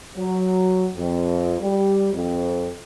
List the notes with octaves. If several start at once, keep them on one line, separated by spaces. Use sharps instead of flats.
F#3
F2
G3
F2